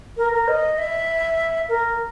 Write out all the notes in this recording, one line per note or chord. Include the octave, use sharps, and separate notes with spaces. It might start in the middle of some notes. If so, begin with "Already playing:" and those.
A#4
A#4
D#5
E5
A#4